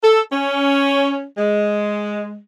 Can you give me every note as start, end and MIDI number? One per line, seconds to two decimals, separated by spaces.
0.02 0.20 69
0.31 1.24 61
1.38 2.38 56